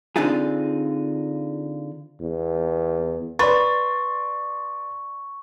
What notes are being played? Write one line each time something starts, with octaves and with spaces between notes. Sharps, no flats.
D3 C4 D4 D#4 F4 G#4
E2
B4 D5 C6 C#6 A6